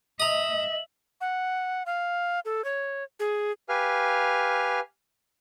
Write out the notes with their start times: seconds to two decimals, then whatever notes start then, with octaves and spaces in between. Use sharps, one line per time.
0.20 D#5 E5 A#5 D#6 F#7
1.21 F#5
1.86 F5
2.45 A4
2.65 C#5
3.20 G#4
3.69 G4 B4 F5 G#5 F6